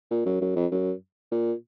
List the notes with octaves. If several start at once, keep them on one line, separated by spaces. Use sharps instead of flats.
A#2
F#2
F#2
F2
F#2
A#2